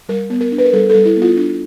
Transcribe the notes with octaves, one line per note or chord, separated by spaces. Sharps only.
G3 A#4
B3
A#4
D4
B4
A#4
G3 A4
G3 A4
E4
B3
F4
D4